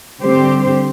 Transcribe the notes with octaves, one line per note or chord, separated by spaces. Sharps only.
D3 G3 C4 G4 C5